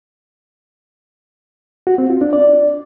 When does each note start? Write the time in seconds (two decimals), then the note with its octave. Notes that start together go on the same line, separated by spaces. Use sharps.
1.87 F#4
1.98 C4
2.10 F4
2.21 D4
2.33 D5